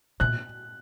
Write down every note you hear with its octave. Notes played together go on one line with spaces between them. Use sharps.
A#2 F#6